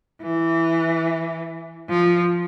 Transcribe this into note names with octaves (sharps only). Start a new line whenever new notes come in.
E3
F3